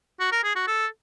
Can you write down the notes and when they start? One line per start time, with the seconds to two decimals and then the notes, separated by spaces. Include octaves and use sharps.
0.20 F#4
0.32 A#4
0.43 G#4
0.55 F#4
0.67 A4